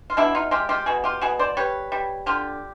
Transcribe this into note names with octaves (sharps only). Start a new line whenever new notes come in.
F4
B2 D4 E4
D#4 F4
G#3 F4 G4
F4 G4
B2 F#4 G#4
F4 G4
B2 F#4 G#4
C5 D5
G3 B4 C#5
G3
D3 F4 G4